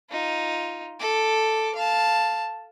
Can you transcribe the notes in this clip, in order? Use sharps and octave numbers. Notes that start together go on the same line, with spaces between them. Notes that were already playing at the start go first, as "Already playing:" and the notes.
D#4 F4
A4 D6
F5 A5